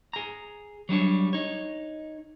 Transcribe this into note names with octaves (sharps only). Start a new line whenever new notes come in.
G#4 A#5
F#3 G3 D4 C#5
D#4 C#5